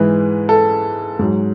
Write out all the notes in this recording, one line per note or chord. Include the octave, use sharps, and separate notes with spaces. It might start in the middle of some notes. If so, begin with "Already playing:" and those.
Already playing: G#2 E3 G#3 B4
A4
G#2 F#3